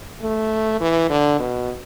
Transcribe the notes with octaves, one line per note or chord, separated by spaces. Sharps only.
A3
E3
D3
B2